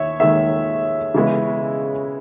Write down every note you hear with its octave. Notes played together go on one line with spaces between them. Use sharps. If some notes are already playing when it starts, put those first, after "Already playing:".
Already playing: D#2 C#5 E5
D#2 D#3 G#3 E5
C#3 E3 G#3 B3